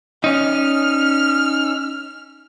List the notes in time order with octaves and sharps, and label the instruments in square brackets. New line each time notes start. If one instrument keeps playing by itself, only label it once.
[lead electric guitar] C#4 D#4 [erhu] F6